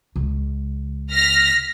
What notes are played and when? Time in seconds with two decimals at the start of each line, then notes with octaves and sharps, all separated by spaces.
0.16 C#2
1.13 F6 A#6 B6